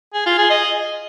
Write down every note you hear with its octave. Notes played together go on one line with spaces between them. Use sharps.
G#4
F4
G#4
D#5